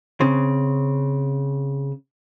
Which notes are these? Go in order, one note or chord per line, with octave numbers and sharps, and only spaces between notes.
C#3 C4